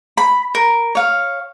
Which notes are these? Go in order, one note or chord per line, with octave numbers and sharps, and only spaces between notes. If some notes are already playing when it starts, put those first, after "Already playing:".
B5
A#4
C#5 F5